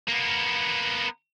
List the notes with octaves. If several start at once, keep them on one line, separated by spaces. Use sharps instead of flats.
A#3 B3